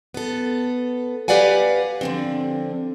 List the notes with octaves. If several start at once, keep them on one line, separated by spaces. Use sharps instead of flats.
B3 A4
G4 B4 D5 F5 F#5 G#5
D3 F3 C4